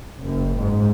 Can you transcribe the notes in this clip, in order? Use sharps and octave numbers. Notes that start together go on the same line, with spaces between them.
F#1
G#2